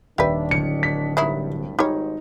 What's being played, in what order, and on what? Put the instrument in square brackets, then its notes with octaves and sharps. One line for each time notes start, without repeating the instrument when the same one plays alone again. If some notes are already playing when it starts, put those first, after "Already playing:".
[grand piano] D#1 D5 B6 [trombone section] D#3 D4 [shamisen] G4 B4 [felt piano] E5
[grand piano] D1 [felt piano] C#7
[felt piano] B6
[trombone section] C2 G2 [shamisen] D#3 F#3 E4
[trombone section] G#1 [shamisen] G3 C#5 [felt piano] D#4